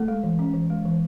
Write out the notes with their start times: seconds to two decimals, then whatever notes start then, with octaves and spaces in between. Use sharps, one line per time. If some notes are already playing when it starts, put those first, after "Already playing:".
Already playing: A3 A4
0.08 G#3
0.23 E3
0.39 C#4
0.54 E3
0.70 G#3
0.85 E3